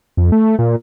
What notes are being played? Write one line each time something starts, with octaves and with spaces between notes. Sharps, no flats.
F2
A3
A#2